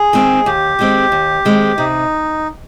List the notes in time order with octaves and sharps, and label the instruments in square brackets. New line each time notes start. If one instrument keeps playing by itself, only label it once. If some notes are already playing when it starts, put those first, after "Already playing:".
Already playing: [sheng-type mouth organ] G#4
[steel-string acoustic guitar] D#3 G#3 C4
[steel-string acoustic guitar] D#2 [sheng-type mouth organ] G4
[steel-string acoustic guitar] D#3 G#3 C4
D#2
D#3 G#3 C4
[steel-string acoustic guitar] C3 [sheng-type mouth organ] D#4